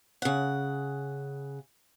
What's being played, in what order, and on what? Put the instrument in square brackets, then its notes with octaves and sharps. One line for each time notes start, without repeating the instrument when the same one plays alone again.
[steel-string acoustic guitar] C#3 F#5